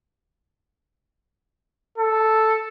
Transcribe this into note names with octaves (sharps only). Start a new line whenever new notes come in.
A4